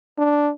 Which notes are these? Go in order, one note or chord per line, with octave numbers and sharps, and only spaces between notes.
D4